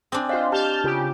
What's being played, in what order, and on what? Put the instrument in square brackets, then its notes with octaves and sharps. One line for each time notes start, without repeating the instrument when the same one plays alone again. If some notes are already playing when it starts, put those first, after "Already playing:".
[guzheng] C4 D4 [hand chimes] G#5 C6 D#6
[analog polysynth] F4 C5 [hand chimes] D#5 F5 F#6
[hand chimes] G4 [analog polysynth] A5 F6 G6
[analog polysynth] C#3 G4 [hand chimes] F4